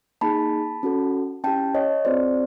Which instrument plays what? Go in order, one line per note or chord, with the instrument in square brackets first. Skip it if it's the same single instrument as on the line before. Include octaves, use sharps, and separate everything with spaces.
[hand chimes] A#3 D#4 G#4 A5 B5
C#4 F#4 A4
C#4 E4 G4 G5 A5
C#5 D#5
C4 F4 G#4 C5 D5